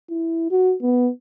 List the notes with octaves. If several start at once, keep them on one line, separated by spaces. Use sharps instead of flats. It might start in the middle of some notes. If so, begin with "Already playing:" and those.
E4
F#4
B3